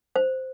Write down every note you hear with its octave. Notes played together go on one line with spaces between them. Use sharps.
C5